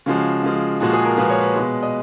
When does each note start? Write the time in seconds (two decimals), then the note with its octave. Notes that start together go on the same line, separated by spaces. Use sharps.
0.06 C#3 F3 G#3 F#4
0.43 C#3 F3 G#3
0.80 A#2 F3 G#3 F#4
0.93 G#4
1.05 A#4
1.17 A#2 F3 G#3 B4
1.29 C#5
1.41 B4
1.56 B2 G#3
1.83 D#5